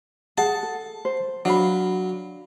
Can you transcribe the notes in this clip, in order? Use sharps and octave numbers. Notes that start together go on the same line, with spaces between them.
G#4 F#5 A5
A4
C5
F#3 D4 F5 B5